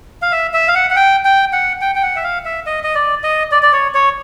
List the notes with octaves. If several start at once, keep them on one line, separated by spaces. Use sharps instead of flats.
F5
E5
E5
F5
F#5
F#5
G5
G5
F#5
G5
G5
F#5
E5
F5
E5
D#5
D#5
D5
D#5
D5
D5
C#5
C#5